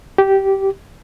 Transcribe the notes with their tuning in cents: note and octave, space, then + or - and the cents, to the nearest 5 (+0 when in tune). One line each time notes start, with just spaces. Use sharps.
G4 -15